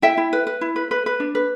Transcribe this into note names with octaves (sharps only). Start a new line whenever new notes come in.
E4 E5 G5
E4
B4
B4
E4
B4
B4
B4
D4
B4